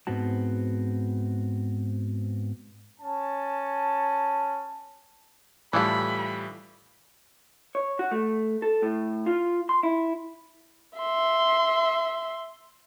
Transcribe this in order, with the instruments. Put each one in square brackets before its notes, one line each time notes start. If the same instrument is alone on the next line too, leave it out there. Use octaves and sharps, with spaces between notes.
[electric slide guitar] G#2 B3 C4 F#4 A5
[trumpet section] C#4 A5
[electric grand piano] A2 G3 [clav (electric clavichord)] E3 [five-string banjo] E4 F4 A4 [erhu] B5
[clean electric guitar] C#5
F#4
A3
A4
A2
F4
C6
E4
[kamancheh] E5 C6